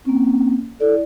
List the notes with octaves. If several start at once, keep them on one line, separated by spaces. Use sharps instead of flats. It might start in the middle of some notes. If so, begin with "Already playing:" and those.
A#3 C4 C#4
E4 A4 D5